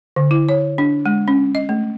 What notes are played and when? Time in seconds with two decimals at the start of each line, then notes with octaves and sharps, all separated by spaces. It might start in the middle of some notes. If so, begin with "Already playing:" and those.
0.16 D3
0.31 E4
0.49 C#5
0.78 D4
1.06 G#3
1.28 C#4
1.55 D#5
1.69 A3